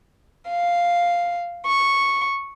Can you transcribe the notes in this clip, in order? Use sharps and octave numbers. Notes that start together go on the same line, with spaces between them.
F5
C#6